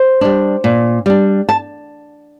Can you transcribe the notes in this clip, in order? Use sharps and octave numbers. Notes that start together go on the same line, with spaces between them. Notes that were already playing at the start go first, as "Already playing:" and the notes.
Already playing: C5
G3 D4
A#2
G3 D4
A5